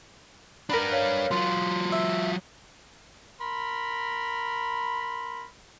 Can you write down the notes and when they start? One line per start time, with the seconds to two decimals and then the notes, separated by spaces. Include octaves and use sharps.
0.70 D4 A#4 B4 F#5 B5
0.92 C#5 F5 F6
1.31 F#3 F4 C6
1.92 E5
3.41 A#4 B5 C6